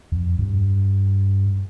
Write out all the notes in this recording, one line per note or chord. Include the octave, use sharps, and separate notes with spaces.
F2
G2